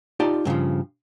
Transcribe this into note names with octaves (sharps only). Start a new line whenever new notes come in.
D#4 F4 G4 D5 A5
G2 C#3 E3 F3